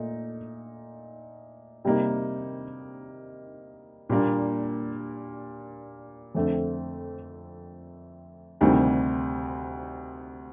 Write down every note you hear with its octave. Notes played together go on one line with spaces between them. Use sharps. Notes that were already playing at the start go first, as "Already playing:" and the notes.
Already playing: A#2 A3 D#4
C3 G3 A#3 D#4
A#2 G3 A#3 D4
F2 D3 A3 C4
D2 C3 D#3 G3 C4